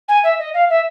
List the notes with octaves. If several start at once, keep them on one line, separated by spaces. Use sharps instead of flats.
G#5
E5
D#5
F5
E5